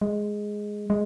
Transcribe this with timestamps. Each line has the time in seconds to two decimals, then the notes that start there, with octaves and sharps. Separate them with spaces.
0.01 G#3
0.90 G#3